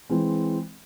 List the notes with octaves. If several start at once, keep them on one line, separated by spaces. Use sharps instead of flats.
E3 G#3 C4